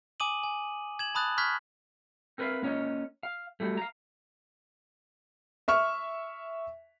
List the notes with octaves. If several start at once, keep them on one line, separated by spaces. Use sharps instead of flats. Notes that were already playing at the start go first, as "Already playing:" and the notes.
G#5 D6 D#6 D#7 F#7
G#5
G#6 E7 F#7
A5 B5 D#6 F#6 A6
B5 C#6 F6 F#6 G#6 B6
C4 A#4 B4 C#5 E5 F5
A#3 C#4 C#5 D#5
F5
F#3 G3 A3
F5 A#5
E5 C#6 F6